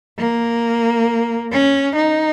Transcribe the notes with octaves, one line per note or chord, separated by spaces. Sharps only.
A#3
C#4
D#4